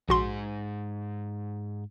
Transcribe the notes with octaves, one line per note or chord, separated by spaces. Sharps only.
A#1 G#2 F#4 G#4 C6